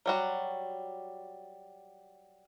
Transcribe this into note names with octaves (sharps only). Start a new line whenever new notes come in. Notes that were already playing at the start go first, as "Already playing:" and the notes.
F#3 G3 F#4